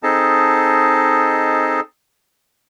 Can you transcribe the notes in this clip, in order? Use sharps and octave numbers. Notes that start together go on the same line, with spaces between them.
C4 D#4 G#4 A4 D#5 A5